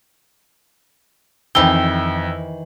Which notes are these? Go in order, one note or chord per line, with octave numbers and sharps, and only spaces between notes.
F2 D#3 E3 G5 E6 G7